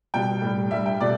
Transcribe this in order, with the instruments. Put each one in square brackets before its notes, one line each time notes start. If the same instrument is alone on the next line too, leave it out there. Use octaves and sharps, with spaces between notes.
[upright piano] B2 G3 G5
A2 G3
G2 G3 E5
G5
B2 A3 D5